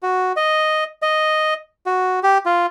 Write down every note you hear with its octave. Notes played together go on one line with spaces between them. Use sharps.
F#4
D#5
D#5
F#4
G4
F4